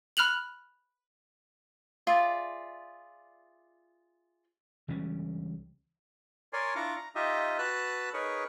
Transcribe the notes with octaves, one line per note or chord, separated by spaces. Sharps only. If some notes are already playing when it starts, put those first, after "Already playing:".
B5 F6 F#6 F7 F#7
F4 G#4 D5 E5
C#2 E3 G3 C#4
A#4 C#5 D5 G#5 C6
D4 E4 F4 A#5 C#6 D6
A#5
D#4 F4 G4 D#5 E5
F#4 B4 A5 E6 F#6
D#4 G#4 A#4 B4 C#5 C#6